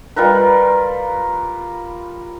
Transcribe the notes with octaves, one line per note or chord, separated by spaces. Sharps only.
G3 F4 A#4 B4